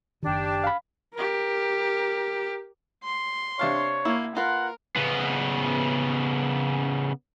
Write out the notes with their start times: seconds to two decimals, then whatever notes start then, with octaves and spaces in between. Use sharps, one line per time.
0.23 F#1 D#3 D4 G4
0.64 F5 B5
1.14 G4 A#4
3.04 C6
3.59 C3 D4 C#5 F5
4.05 A#3 E4
4.37 F4 A#4 B4 F#5
4.96 C#3 B3